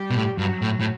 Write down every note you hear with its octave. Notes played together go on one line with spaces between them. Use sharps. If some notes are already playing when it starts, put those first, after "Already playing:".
Already playing: G3 G4
B2
A2
G2 F#3 F#4
A2
A2